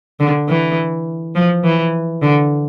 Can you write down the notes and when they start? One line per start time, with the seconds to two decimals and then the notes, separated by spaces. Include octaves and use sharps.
0.20 D3
0.49 E3
1.35 F3
1.64 E3
2.22 D3